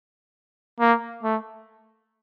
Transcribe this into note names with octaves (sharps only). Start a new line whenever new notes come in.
A#3
A3